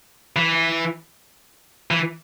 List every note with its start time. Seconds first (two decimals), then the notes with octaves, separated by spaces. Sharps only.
0.36 E3
1.91 E3